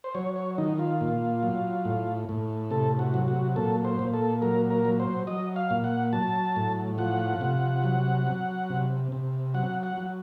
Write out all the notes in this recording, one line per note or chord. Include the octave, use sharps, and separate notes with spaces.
C5
F#3 C#5
C#5
D#3 D#4
F4
A#2
F#3
A2
A2
C3 A4
F#4
F#3
F#4
A#2 A4
C5
A#2
A4
F#3 A#4
A#4
F#3
C5
F#3 D#5
F5
A#2
F#5
F#3 A5
A2
F3 F#5
C3
F#3
F#3
C3
C3
F#3 F#5
F#5
F#3